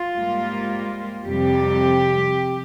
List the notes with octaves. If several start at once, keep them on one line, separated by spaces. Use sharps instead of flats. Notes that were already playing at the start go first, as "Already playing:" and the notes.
Already playing: F4
G#2 G3 A#3
F2 C3 G3 G4